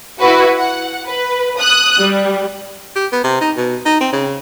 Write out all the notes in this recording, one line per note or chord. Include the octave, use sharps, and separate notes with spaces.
E4 F#4 B4
F#5
B4
D#6 F#6
G3
G4
B3
C3
D#4
B2
D#4
C4
C#3